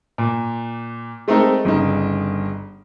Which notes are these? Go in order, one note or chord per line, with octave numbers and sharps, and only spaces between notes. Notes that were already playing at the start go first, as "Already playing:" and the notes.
A#2
G#3 A3 C4 D#4 A4 A#4
G1 C#3 D#4